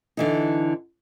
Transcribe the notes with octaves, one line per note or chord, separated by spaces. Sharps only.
D3 E3 D#4